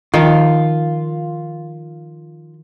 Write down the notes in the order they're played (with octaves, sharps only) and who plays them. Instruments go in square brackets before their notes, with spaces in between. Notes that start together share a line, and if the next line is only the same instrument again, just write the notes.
[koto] D#3 F3 [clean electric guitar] F4